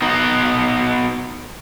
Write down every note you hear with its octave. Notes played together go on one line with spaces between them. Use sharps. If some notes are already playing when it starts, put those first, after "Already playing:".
B3 D#4 F#4